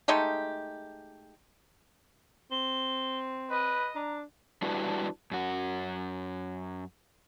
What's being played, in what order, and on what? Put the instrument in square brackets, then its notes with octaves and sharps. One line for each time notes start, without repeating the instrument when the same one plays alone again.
[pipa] G#3 A3 D#4 G4
[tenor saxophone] C4 [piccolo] G7
[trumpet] B4 [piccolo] D#5
[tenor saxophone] D4 [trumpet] A#5
[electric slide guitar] G3 D4 E4 F#4 B4
F#2 F#4